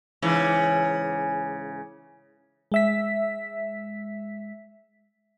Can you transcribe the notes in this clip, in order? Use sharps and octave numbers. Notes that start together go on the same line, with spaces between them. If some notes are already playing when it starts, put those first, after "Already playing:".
G#2 C#3 E3
G#3 E5 B6